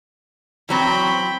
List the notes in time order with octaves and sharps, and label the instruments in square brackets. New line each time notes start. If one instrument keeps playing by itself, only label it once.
[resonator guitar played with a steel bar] E3 F#3 C4 [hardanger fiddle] G5 B5